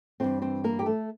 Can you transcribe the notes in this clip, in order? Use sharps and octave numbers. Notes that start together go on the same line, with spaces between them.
G2 E3 C4 C5
C4 C5
A#3 A#4
G4
A3 A4